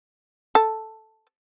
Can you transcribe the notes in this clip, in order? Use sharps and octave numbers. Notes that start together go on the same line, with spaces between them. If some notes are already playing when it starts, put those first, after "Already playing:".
A4